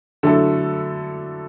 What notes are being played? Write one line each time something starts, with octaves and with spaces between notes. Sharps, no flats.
D3 F#3 A3 E4 A4